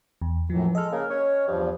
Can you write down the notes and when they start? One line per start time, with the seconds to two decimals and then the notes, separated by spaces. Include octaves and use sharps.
0.22 E2
0.50 F#2 A2 E3 F3
0.75 G#3 A4 D#5 F6
0.92 C#3 A#3 A#4
1.10 C#4 C#5
1.48 E2 G2 F3